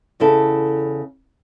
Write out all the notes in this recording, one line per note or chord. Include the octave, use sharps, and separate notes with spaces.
E2 C#3 E4 A4